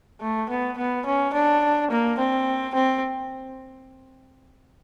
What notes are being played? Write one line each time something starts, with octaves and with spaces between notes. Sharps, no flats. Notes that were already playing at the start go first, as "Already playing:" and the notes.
A3
B3
B3
C#4
D4
A#3
C4
C4